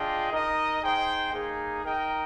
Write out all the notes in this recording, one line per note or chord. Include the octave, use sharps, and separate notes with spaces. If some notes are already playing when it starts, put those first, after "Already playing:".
Already playing: D4 F4 G#4 D#5 G5
D#4 A#4 D#5
D#4 G#4 C5 G5
A#3 D#4 G#4
D#4 A#4 D#5 G5